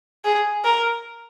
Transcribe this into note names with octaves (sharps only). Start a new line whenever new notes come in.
G#4
A#4